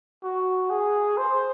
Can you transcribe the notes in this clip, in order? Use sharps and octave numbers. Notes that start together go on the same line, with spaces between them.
F#4
G#4
C5